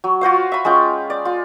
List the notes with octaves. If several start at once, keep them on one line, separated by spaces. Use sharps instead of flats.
F#3
F4 F#4 C5 F5
E5 B5
G#3 C#4 F4 G5
D5
F4